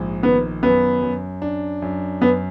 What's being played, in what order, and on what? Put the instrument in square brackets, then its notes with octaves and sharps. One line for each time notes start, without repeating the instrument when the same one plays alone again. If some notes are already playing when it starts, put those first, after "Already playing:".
Already playing: [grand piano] A#1 G#2
[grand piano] D#3 [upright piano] B3
[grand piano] F#2 [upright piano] B3
[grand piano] F#2
D4
F#2
[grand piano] F#2 [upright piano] B3